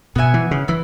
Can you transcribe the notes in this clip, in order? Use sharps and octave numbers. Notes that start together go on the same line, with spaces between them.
B2 B3 F#4 E5 G#5
E3
C#3
E3 E4